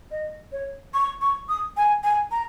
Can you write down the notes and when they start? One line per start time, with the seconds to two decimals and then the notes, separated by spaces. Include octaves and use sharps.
0.11 D#5
0.52 C#5
0.94 C#6
1.21 C#6
1.49 D#6
1.77 G#5
2.03 G#5
2.31 A#5